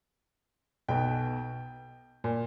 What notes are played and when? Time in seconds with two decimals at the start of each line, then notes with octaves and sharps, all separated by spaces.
0.88 B1 B2 G5
2.24 A#2